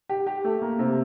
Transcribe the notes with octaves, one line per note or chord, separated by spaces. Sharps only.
G4
G4
A3
A#3
C3